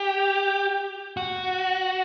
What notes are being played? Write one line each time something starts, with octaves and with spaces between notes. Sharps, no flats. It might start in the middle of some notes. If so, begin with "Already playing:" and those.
Already playing: G4
F#4